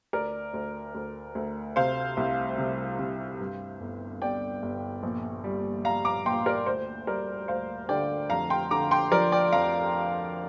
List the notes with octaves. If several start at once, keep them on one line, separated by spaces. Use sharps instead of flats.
D2 A#4 D5
D2
D2
D2
C3 C5 F5
C2
C3
C3
G2
G1
G1 D5 G5
G1
A#1
G3
G3 F5 A#5
A#5 D6
A#1 G5 C6
A#4 D5
D2 C5
G3 A#4 D5
D2 C5 F5
D3 D5 G5
F2 F5 A#5
G5 C6
D3 A#5 D6
G5 C6
F3 A#4 D5
D5 G5
F2 F5 A#5